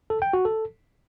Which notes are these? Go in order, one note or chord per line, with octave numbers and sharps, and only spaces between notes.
A4
G5
F#4
A4